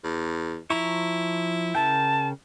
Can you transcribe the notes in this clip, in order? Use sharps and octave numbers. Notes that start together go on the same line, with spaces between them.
E2
F3 E4 A#5 C#6
C#3 A#4 G5 A5